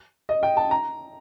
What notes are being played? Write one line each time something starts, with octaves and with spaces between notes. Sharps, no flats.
D#5
G5
A5
A#5